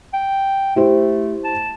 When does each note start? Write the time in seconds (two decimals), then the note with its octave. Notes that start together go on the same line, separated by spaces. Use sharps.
0.14 G5
0.76 A3 E4 G4 C5
1.44 A5